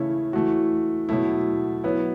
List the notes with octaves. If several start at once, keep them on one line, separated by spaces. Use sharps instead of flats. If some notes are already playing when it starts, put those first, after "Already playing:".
Already playing: C#3 E3 A3 C#4 E4
E3 A3 F#4
B2 F#3 A3 E4
F#3 B3 E4